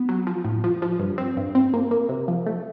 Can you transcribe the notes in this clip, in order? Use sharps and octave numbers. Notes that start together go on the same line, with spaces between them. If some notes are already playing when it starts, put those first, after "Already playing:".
Already playing: B3
F#3
F3
A2
F3
F3
G2
C4
G2
C4
A#3
A#3
C3
F3
A3